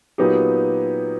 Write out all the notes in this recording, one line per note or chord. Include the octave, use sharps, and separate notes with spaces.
A#2 F#3 B3 D#4 G4